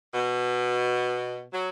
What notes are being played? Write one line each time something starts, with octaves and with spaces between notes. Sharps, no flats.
B2
F#3